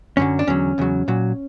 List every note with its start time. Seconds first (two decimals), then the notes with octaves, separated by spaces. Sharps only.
0.17 F#2 D3 F#3 C#4
0.39 D4
0.47 E2 D3 F#3 C#4
0.78 E2 C#3 F#3
1.08 A#2 F#3